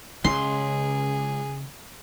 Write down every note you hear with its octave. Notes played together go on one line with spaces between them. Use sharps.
C#2 C#3 G#4 C6